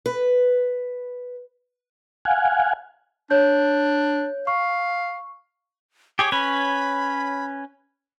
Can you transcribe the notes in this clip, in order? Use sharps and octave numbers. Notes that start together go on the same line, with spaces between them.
B4
F5 F#5 G#5
D4 C#5 G6
F5 C#6
G4 G#4 C#5 D6
C#4 B4 C#5 B5